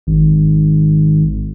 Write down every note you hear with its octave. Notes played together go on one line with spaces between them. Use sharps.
G#1